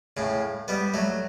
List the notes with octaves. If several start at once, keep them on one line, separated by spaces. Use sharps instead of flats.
A2 C#3
G3 B3
F#3 A3